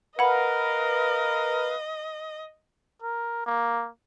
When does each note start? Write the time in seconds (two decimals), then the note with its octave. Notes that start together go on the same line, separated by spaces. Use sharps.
0.19 A#4 B4 D#5 F5 F#5 B5
3.02 A#4
3.46 A#3